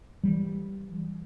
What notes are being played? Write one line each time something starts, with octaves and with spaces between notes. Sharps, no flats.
E3 G3